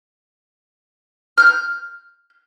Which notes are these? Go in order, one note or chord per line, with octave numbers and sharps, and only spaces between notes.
F6 G6